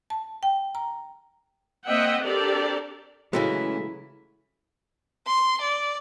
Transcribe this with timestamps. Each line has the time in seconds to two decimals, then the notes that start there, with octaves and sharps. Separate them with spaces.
0.10 A5
0.43 G5
0.75 A#5
1.86 A#3 C4 D#5 E5 F#5 G5
2.23 C4 D4 G4 A4 A#4 D5
3.33 C#3 E3 F#3 G#3 A3 E4 F#4
5.26 C6
5.61 D5